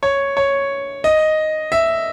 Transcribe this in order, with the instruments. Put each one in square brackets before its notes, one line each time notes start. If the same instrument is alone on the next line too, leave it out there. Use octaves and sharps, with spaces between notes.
[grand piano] C#5
C#5
D#5
E5